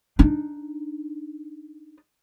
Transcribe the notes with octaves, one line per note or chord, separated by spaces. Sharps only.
D4 D#4